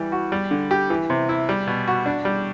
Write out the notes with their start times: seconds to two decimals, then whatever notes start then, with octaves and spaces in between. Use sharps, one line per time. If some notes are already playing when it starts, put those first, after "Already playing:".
Already playing: E3 G3
0.12 F#4
0.32 G3
0.51 D3
0.71 G4
0.90 E3
1.10 C3
1.29 E4
1.49 G3
1.67 B2
1.87 F#4
2.06 D4
2.25 G3